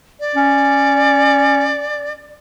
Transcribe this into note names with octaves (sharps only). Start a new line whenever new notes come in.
D5
C#4